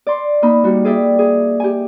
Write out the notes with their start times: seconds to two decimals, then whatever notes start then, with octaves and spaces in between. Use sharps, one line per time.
0.07 D5 C6
0.42 A#3 D#4 B5
0.64 G3 F#4
0.85 G#4 D5 E5 G5
1.19 G#4
1.60 G4 G#5